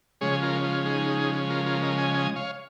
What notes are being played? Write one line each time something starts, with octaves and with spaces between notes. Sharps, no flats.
C#3 F3 G#3 C#4 G#4 C#5
F4 A#4
F4
D#4 G#4
F4 A#4
F4 A#4
A#4 D#5
D#5 G#5
D#5 G#5
C#5 F5